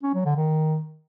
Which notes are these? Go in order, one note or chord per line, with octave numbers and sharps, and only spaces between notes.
C#4
F#3
D3
D#3